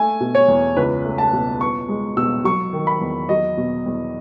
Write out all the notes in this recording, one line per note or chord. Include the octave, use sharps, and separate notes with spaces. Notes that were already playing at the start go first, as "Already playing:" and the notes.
Already playing: A3 G#5
B2
C#5
E2
C#2 B4
A3
A5
B2
B3 C#6
G#3
B2 E6
F#3 C#6
D#3
B5
E2
F#3 D#5
B2
E2